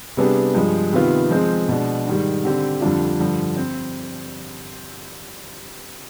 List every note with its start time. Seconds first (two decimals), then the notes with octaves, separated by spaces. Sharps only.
0.17 C3 G3 B3 D4 G#4
0.55 G2 F3 G#3
0.93 C3 D#3 B3 F4
1.30 F3 G#3 C4
1.68 B2 G#3 D4
2.07 G#2 D#3 G3
2.44 D3 G3 C4 G4
2.81 F2 D3 G3 D4 F4
3.19 G2 D3 F3
3.57 C4